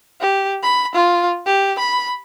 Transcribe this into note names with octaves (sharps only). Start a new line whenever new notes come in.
G4
B5
F4
G4
B5